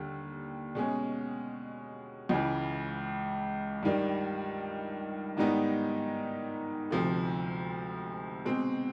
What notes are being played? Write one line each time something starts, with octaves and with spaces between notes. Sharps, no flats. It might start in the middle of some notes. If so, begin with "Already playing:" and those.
Already playing: D#2 D3 G3
B2 G#3 C#4
C#2 C#3 E3
G2 D#3 G3
G#2 D#3 G3 B3 D#4
D2 C3 F3 A3
B2 G#3 C4